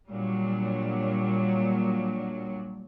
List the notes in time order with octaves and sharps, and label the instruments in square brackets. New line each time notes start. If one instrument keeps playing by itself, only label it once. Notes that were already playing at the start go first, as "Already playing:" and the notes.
[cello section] A#2 F#3 G3 D4